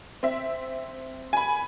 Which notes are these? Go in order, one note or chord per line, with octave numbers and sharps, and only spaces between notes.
C4 E5
G#5 B5